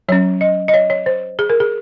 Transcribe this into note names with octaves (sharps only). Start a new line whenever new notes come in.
F#3 C#4 C#5
D#5
D#5
C#5
C#5
C5
G#4
A#4
G#4